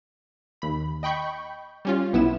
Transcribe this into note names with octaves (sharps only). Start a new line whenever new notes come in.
D#2 B5
D#5 G5 B5 C#6 G6
G3 C#4 F4
B1 B3 E4 E7